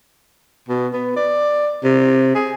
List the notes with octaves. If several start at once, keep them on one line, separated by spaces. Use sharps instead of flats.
B2
B3
D5
C3
G#4